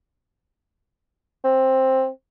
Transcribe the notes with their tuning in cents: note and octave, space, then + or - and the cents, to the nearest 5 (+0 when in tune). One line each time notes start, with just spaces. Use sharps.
C4 +10